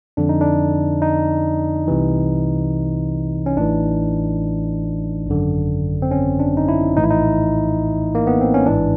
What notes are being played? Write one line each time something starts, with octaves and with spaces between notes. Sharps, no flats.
F2 D3 D4
D#4
D4
D#4
C2 C3 E3
C#4
A1 A2 E3 D4
G#1 F#2 D3
C4
C#4
D4
D#4
E4
A#1 A2 E3 D#4
E4
D#4
A#3
B3
C4
C#4
A1 G#2 E3 D4